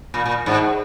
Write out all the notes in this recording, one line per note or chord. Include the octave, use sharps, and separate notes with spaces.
A#2
A#2
G#2